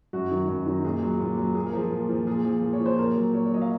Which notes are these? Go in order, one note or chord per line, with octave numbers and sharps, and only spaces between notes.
F#2 F#4
D#3 F#3
F#2
D#3 F#3
A#2 G#4
F#3
A#2
F#3
A#2 G#4
A#4
F3 G#4
A#2
F3
A#2 G#4
F3
A#2
C#5
F3
C5
A#2 A#4
F#3
A#2 C#5
C#5
F#3 D#5
F5